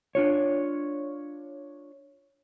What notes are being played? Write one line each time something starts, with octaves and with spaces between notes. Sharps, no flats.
D4 F4 C#5